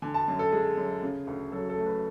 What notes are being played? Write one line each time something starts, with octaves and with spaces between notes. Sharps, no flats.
D3 G#5
A5
F#2
A4
G#3 G#4
F#2
C#3
D2
F#3 A4
A4
A3
B4